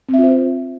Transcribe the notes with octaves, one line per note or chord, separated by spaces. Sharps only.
C4 F4 C5 E5